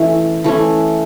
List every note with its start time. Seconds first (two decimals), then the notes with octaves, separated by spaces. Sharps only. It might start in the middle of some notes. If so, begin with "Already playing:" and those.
Already playing: E3 A3 C#4
0.44 E3 A3 C#4